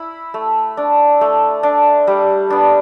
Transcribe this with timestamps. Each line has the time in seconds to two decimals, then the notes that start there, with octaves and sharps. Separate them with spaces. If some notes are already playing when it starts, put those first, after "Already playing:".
Already playing: E4 B5
0.34 A3
0.77 D4
1.21 A3
1.63 D4
2.07 G3
2.50 B3 D4